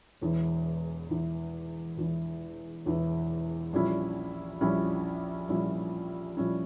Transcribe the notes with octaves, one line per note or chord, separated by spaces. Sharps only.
E1 E2 E3
E1 E2 E3
E1 E2 E3
E1 E2 E3
A#1 A#2 G3 C#4 E4
A#1 A#2 G3 C#4 E4
A#1 A#2 G3 C#4 E4
A#1 A#2 G3 C#4 E4